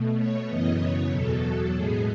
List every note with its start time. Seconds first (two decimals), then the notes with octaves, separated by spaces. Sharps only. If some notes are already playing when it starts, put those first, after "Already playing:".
Already playing: B2 A3
0.16 C#5
0.47 F#2 C#3 E3 B3 D#5
0.78 C#5
1.10 E2 B2 F#3 A4
1.73 A2 G#3 B3 G#4